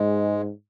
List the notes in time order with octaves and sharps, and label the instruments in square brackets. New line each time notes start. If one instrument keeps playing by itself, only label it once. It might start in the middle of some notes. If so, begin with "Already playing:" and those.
Already playing: [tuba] G#2 [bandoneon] G#3